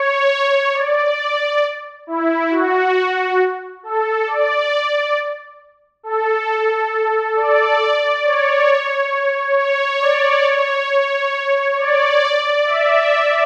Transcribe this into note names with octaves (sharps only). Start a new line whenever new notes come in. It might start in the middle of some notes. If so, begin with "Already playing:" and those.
Already playing: C#5
D5
D5
E4
F#4
A4
D5
A4
D5
C#5
C#5
D5
C#5
C#5
D5
E5